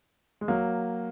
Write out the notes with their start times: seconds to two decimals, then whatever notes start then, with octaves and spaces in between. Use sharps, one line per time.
0.41 G#3
0.48 F#3 A#3